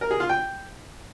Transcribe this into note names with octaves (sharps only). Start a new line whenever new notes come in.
A#4
G#4
F4
G5